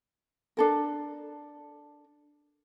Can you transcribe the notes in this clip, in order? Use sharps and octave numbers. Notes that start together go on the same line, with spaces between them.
D4 A4 A#4